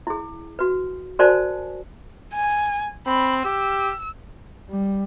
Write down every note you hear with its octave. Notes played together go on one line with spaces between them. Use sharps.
E4 G#4
F#4 B4
F#4 A#4 C5 D5 G#5 A5
G#5
C4 B5
G4 E6
G3